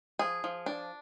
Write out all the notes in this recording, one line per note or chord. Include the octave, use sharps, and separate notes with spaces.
F3 G#4
F3
D4